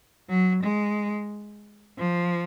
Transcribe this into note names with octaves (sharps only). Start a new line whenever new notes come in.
F#3
G#3
F3